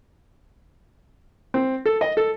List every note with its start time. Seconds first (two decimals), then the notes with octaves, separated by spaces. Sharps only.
1.54 C4
1.85 A4
2.01 D#5
2.17 A4